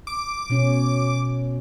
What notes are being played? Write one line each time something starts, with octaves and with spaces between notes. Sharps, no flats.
D6
B2 C#4